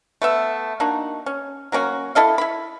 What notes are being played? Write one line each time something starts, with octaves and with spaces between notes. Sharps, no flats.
A3 B3 E5
A#3 D4 D#4 F#4
C#4
F#3 A#3 C#4 F#4
E4 A4 D#5 F5
E4 B5